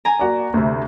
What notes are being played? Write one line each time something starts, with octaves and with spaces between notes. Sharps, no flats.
G#5 A#5
A#3 F#4 D5
D2 C3 E5